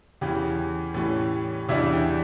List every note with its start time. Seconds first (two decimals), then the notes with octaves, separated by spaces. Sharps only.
0.21 E2 C#3 E3 G4
0.94 A2 E3 G3 C#4
1.68 E2 C#3 E3 G3 D4 E5
1.93 G5